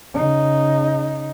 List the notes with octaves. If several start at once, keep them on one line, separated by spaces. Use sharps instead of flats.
C#3 D#4